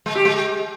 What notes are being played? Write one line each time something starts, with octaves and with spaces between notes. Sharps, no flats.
G#3
G4
G#3